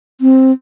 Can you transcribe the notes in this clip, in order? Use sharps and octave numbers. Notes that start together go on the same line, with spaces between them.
C4